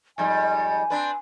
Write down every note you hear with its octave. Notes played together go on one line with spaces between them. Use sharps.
F2 G#2 G3 G#5
C4 D4 B4